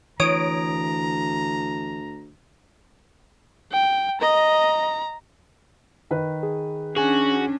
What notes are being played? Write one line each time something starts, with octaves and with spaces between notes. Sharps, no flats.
D2 E3 C#5 A#5 D#6 D7
G5
D#5 A#5
D#3 B4
G#4
C#4 D4 F#4 G#4 G#5